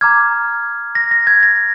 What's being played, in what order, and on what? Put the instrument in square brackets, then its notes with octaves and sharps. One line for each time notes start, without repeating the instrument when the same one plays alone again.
[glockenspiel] A#5 D6 F6 G#6
A#6
A#6
G#6
A#6